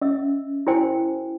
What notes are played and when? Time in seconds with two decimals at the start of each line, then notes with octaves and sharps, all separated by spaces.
0.01 C#4 D#5 E5 E6
0.67 E4 F#4 A#4 C5 G5 G#5